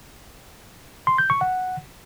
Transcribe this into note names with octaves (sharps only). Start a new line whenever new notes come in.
C6
G6
C#6
F#5